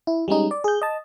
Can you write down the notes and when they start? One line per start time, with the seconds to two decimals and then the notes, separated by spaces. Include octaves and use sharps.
0.07 E4
0.28 G3 G#3 C#4 D#4
0.51 D5
0.64 G#4 G6
0.82 D#5 A5